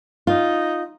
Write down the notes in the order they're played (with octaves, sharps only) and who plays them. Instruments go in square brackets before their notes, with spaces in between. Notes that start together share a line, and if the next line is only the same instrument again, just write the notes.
[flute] D#4 [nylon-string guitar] F4